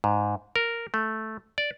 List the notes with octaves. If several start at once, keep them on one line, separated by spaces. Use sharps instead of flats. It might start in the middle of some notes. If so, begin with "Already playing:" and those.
G#2
A#4
A3
D5